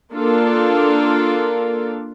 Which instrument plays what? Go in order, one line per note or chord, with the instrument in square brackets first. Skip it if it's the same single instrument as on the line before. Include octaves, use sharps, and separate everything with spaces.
[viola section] A#3 D4 F4 A4